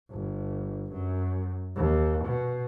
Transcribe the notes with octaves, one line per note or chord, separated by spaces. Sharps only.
G1
F#2
D#2
B2